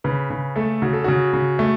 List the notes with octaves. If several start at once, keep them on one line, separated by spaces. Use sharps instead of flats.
C#3 B4
C#3
A3 A4
C#3 F#4
A4
C#3 F#4
C#3
A3